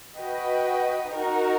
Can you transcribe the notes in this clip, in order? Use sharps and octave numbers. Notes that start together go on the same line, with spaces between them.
F#4 B4 D#5 G5
D#4 F#4 A#4